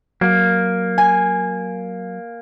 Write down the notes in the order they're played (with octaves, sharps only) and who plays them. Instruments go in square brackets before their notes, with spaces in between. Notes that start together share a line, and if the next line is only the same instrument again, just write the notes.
[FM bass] F#3 [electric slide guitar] A#3
[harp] G#5